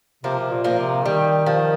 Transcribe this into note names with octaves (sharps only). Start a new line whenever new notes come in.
C3 F3 A#3
C3
A#2
F3 A#3
C3
D#3 G3
F3